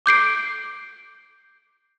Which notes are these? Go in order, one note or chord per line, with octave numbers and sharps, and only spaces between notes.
D6 G6 C7 D7